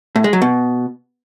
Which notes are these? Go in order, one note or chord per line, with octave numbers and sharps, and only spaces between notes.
A2
G#3
F#3
B2